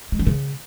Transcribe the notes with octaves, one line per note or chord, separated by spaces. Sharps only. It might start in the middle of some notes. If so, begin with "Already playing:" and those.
G#3
C#4
C#3